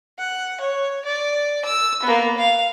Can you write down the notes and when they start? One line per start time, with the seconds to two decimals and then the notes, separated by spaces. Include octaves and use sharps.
0.19 F#5
0.60 C#5
1.05 D5
1.65 E6
2.03 A#3 B3
2.37 F5